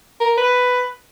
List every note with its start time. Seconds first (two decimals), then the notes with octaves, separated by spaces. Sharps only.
0.21 A#4
0.38 B4